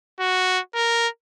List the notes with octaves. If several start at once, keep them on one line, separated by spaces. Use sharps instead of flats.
F#4
A#4